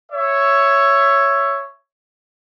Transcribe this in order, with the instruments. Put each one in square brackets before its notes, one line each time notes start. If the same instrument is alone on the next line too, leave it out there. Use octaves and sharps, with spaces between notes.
[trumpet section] C#5 E5